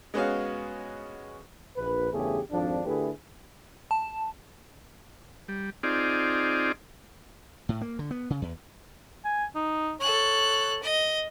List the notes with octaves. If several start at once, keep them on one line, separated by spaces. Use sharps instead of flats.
G#3 B3 C#4 F#4 F5
A#1 B4
E2 G2 C#3 A3 G4 G#4
G#1 F2 F3 D4
D3 A3 E4 G4 G#4 B4
A5
G3
C4 D#4 F4 G#4 D5
A2
A#3
D3
B3
C#3
E2
G#5
D#4
A4 C#5 F#6
D#5